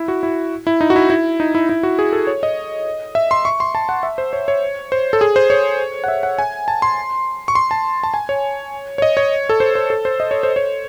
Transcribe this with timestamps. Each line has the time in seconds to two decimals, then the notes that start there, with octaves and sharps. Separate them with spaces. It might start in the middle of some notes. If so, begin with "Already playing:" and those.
Already playing: E4
0.08 F#4
0.23 E4
0.67 E4
0.81 D#4
0.90 F#4
0.96 E4
1.10 E4
1.40 D#4
1.55 E4
1.69 E4
1.83 F#4
1.99 G#4
2.13 A4
2.27 C#5
2.43 D#5
3.15 E5
3.31 C6
3.45 C#6
3.60 C6
3.75 A5
3.89 F#5
4.03 E5
4.18 C5
4.33 C#5
4.48 C#5
4.92 C5
5.13 A4
5.21 G#4
5.36 C5
5.50 C#5
6.04 F#5
6.08 E5
6.23 F#5
6.39 G#5
6.68 A5
6.82 C6
7.48 C#6
7.55 C6
7.71 A5
8.03 A5
8.14 G#5
8.29 C#5
8.98 C#5
9.02 D#5
9.17 C#5
9.49 A4
9.60 C5
9.75 C5
9.90 A4
10.05 C5
10.20 D#5
10.31 C#5
10.43 C5
10.56 C#5